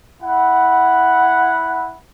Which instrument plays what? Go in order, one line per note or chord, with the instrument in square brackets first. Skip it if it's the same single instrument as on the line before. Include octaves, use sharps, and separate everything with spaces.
[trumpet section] E4 F#5